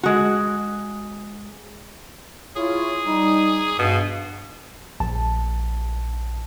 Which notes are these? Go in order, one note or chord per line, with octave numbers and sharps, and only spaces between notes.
G#3 F#4
E4 F4 G#4 C#5
G3 D#4
G2 B2
A#1 A5